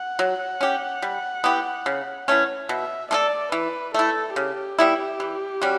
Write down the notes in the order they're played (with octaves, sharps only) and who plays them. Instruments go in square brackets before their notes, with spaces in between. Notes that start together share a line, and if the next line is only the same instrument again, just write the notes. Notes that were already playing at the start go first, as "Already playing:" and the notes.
Already playing: [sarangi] F#5
[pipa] F#3
C#4 G4
G3
B3 E4 G4
C#3
E3 A3 C#4
[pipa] B2 [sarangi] E5
[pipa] A3 D4 A4 [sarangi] D5
[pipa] E3 [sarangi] B4
[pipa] A3 E4 [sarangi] A4
[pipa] C#3 [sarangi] G4
[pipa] G3 B3 E4
E3
G3 C#4 F#4